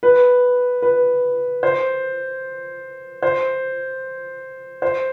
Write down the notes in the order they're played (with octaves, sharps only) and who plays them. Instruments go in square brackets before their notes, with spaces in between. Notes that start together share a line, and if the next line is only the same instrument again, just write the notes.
[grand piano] B4
B4
C5
C5
C5